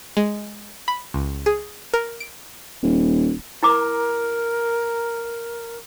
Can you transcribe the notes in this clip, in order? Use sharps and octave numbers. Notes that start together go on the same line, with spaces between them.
G#3
B5
C#2
G#4
A#4
D7
D#1
E4 A#4 A#5 D6